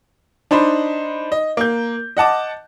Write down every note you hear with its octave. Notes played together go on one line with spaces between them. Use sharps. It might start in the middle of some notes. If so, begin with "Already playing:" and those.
D4 D#4 C5 B5
D#5
A#3 G6
D#5 F#5 A5 D6